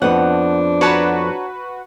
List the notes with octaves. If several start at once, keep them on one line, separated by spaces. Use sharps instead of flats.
F2 B3 D4 F#5
F#4 B4 C#5 A5 A#5